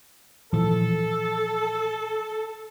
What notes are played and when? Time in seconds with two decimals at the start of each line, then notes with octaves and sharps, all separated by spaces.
0.53 A#2 E3 F3 A4